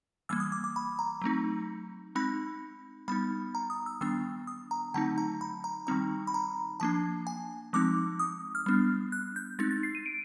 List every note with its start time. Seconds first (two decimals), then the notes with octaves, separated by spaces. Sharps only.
0.29 E3 G3 A#3 E6
0.40 D#6
0.52 D6
0.64 D6
0.76 B5
0.99 A#5
1.22 F#3 A3 C4 D#4
2.15 G#3 C4 D#4 B5
3.08 G3 B3 D#4 B5
3.55 A#5
3.70 D#6
3.86 E6
4.01 D#3 G3 B3 D4 E6
4.47 D#6
4.71 A#5
4.94 D3 F#3 A3 C4 D#4 A5
5.18 A#5
5.41 B5
5.64 A#5
5.87 D#3 G3 C4 D#4 A#5
6.27 B5
6.34 A#5
6.80 F3 A#3 D4 A5
7.27 G#5
7.73 F3 G#3 C4 D#4 D6
8.19 D#6
8.55 F6
8.66 G3 B3 D4
9.12 F#6
9.36 G6
9.59 G#3 C4 D#4 A6
9.71 A6
9.83 C7
9.95 D#7
10.06 D7